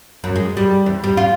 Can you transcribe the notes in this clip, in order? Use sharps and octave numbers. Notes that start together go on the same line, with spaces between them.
F#2
G#3
G3
E2
G3
F4